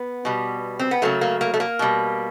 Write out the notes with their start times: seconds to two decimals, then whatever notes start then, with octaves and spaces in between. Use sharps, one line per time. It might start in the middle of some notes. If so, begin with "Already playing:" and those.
Already playing: B3
0.25 B2 G3
0.79 C4
0.91 B3
1.02 C#3 F#3 A3 A#3
1.21 A#3
1.41 A#3
1.54 A3
1.60 A#3
1.79 B2 G3